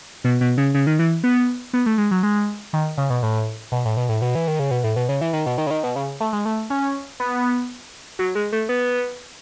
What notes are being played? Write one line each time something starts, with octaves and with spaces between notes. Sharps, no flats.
B2
B2
C#3
C#3
D#3
E3
B3
B3
A3
G#3
F#3
G#3
D#3
C#3
B2
A2
B2
A2
B2
A2
B2
E3
D#3
C#3
B2
A2
B2
C#3
E3
D#3
B2
D#3
C#3
D#3
B2
C#3
A3
G#3
A3
C#4
B3
F#3
G#3
A3
B3